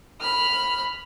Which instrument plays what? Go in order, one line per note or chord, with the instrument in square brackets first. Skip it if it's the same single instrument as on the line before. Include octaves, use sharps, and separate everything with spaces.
[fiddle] B5 F6